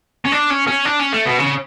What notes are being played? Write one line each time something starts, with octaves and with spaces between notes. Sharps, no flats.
C#4
D4
C#4
C#4
D4
C#4
A3
B2
C#3